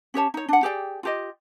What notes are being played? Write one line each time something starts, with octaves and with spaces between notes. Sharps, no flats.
C#4 G4 C#5 A5
D#4 C#5
D4 F#5
G4 G#4 D5 G5
F4 G4 D#5